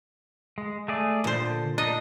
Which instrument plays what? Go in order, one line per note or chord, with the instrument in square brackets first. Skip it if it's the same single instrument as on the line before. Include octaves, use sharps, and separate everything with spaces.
[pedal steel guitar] G#3
A3 G#4 D5
[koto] A#2 C5 [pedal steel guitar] D3
[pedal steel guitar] D4 D#4 [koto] D#5